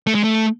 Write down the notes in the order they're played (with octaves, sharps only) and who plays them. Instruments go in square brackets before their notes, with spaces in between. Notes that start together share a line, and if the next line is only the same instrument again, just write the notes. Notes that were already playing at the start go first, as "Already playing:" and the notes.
[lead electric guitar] A3
G#3
A3